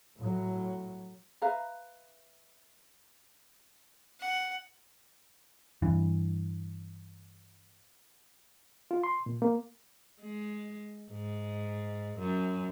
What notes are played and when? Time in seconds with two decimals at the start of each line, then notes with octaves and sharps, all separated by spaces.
0.18 A2 F#3
1.42 B4 E5 F5 A#5
4.20 F#5
5.82 G2 E3
8.91 F4
9.04 C6
9.26 A#2
9.42 A#3
10.20 G#3
11.10 G#2
12.19 F#2